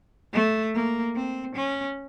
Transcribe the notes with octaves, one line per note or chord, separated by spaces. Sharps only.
A3
A#3
C4
C#4